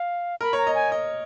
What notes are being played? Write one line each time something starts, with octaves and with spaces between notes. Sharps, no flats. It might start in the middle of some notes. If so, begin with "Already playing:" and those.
Already playing: F5
A#4 B5
C#5
A#5
D#5
G#5
D#5